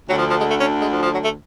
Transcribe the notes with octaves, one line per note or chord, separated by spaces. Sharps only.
D2 D3 F#3
F3
F3
G#3
A3
C#4
G#3
F3
F3
F#3
A3